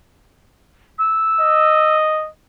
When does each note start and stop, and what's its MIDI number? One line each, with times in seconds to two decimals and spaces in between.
0.98 1.95 88
1.41 2.29 75